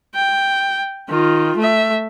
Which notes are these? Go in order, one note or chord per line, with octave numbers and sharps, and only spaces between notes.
G5
D#3 F4
A3 E5